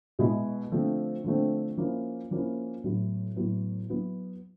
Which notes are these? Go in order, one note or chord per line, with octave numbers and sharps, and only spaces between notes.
B2 G#3 B3 E4
D3 F3 A3 C4
D3 F3 A3 C4
F3 A#3 C#4 E4
F3 A#3 C#4 E4
A2 F#3 B3 E4
A2 F#3 B3 E4
F#3 B3 E4